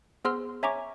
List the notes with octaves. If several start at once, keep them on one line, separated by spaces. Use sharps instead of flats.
B3 G#4 C5 C6 E6 F6
C#5 E5 G#5 A#5 C#6 D6